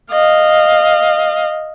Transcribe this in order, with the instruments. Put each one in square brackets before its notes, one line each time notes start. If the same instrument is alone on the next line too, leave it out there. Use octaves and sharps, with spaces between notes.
[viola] D#5 F5